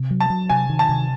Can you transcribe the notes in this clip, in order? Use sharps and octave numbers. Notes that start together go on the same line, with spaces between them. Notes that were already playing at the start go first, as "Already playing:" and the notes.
Already playing: C3
F#3
A5
F#3
C3 G#5
D#3
A5
C3